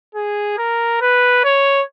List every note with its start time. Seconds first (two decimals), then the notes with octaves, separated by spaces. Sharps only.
0.15 G#4
0.58 A#4
1.01 B4
1.44 C#5